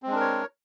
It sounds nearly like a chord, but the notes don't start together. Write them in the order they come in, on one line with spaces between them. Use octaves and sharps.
C4 G#3 D4 A#4 C#5